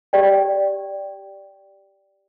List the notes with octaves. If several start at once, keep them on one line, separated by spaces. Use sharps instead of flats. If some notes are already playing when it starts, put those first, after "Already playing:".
G4 D5 G5